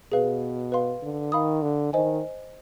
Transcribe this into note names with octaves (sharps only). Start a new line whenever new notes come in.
B2 G#4 B4 F5
B4 F5 C6
D3
D#3 F5 B5 D#6
D3
D#3 C5 D#5 G#5